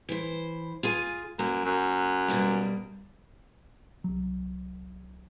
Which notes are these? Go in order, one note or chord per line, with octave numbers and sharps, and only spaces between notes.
E3 C5
F4 G#4 G#5
F#2 A#3
F#2
B2 G3 A#3
C2 F#3